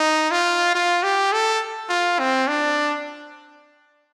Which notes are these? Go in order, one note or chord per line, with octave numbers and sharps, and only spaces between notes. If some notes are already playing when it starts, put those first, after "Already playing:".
Already playing: D#4
F4
F4
G4
A4
F4
C4
D4